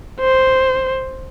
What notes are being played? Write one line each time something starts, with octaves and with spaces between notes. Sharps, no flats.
C5